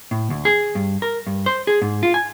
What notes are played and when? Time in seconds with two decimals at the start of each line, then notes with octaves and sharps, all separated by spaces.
0.11 A2
0.30 D2
0.45 G#4
0.75 G2
1.02 A#4
1.27 G2
1.46 C5
1.67 G#4
1.82 G#2
2.03 F4
2.14 G#5